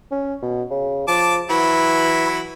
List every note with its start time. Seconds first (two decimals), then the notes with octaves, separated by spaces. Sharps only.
0.11 C#4
0.42 B2
0.70 C#3
1.08 F3 A5 D6
1.50 E3 F#3 E4 B5